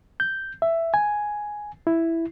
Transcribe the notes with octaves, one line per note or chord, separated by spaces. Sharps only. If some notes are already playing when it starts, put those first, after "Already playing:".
G6
E5
G#5
E4